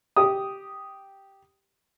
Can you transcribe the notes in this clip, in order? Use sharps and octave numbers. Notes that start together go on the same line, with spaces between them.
G4 D#6